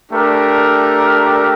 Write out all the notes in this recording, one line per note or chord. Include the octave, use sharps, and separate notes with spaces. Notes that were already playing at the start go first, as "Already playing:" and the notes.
A3 D4 G4 A#4